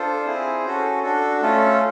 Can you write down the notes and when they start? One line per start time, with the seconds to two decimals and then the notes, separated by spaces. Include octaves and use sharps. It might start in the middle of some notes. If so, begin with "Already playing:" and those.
Already playing: D4 F4 A4 C5
0.26 C4 E4 G#4
0.65 C#4 F#4 A4
1.03 D4 F#4 A4
1.41 A3 C#4 F4 A4